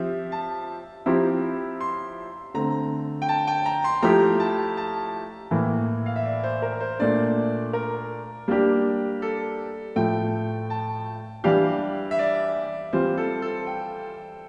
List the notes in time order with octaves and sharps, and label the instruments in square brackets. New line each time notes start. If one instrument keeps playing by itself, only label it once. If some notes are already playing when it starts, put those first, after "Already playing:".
Already playing: [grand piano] F3 C4 G4 [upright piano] E5
[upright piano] A5
[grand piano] F3 C4 E4 G4 [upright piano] A#5
[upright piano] C6
[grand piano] D3 A3 C4 [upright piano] A#5
[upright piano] G5
A5
G5
A#5
C6
[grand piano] F3 A3 E4 G4 [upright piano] A#5
[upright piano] A5
A5
[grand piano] A2 E3 A#3
[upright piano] F5
E5
D5
C5
A#4
C5
[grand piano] A#2 A3 D4 [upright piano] D5
[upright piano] A#4
[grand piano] G3 A#3 D4 G4
[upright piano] A4
[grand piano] A2 F3 A3 [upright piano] G5
[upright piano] A5
[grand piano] E3 G3 D4 G4 [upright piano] F5
[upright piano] E5
D5
[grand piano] E3 G3 C4 F4 [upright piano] C5
[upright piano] A4
A4
G5